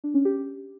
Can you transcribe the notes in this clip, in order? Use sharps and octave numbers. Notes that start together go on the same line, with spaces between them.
D4
C#4
G4